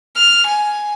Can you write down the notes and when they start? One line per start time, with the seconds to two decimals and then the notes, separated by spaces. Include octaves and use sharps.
0.16 F6
0.47 G#5